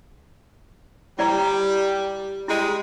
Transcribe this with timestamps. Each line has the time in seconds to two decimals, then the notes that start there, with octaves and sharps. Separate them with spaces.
1.19 G3 E4 D5 A#5
2.48 G3 G#3 E4